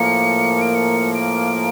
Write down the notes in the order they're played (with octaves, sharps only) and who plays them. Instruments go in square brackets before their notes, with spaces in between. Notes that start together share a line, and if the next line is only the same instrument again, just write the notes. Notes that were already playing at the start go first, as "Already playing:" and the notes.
Already playing: [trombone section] A2 F3 A#3 [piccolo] C#7
[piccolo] D7
C#7
D7